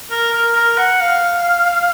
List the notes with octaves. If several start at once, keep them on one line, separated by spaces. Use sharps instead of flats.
A#4
A#4
A#4
F#5
F5